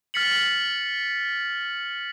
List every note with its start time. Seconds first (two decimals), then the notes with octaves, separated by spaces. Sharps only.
0.14 F6 A6 B6 C#7 F#7